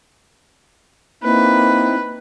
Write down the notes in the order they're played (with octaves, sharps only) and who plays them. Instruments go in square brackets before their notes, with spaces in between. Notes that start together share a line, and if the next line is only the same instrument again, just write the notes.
[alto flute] A#3 [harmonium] C4 D#4 E4 [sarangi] B4